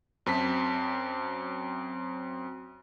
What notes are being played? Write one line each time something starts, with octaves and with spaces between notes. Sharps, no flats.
F#2 C4 A5 B6